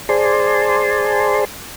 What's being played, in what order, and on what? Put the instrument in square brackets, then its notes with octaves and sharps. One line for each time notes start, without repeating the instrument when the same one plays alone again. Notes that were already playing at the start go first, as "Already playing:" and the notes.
[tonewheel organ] G#4 C5 D5 G#5 A5 C6